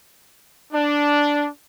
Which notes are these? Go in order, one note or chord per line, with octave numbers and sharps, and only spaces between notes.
D4